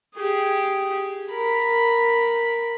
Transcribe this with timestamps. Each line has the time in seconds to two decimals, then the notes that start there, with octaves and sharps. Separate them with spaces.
0.15 G4 G#4
1.29 A#4 B5